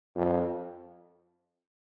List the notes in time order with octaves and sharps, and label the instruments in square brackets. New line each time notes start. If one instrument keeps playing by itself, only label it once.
[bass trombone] F2